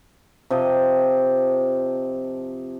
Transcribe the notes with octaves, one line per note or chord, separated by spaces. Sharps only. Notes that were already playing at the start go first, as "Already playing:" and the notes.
C3 F3 D#5